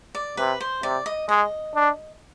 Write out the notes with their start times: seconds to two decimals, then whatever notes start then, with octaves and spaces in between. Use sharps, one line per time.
0.15 D5
0.37 C3 B4
0.61 C5
0.83 C3 D5
1.06 D#5
1.29 G#3 D#5
1.75 D4